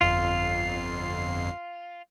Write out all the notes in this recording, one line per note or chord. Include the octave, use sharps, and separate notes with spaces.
G1 F2 F4 C7